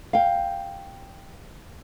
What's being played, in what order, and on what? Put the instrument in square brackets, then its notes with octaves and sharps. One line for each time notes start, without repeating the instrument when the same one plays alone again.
[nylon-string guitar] F5 G5